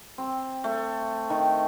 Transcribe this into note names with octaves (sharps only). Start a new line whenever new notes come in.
C4
A3
D#3